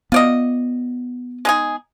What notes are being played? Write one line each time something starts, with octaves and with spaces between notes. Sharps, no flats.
B3 F4 D5 D#5
G#3 D#4 G#4